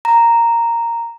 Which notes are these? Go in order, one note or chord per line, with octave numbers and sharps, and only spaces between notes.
A#5